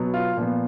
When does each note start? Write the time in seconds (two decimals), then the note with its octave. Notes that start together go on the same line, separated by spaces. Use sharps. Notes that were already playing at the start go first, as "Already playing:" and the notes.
Already playing: B2 F#3 B3
0.14 F4
0.37 A#2 F3 B3